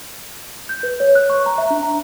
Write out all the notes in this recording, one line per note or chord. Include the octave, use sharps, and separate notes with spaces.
G6
B4
C#5
F#6
C#6
A#5
E5
D4
A#5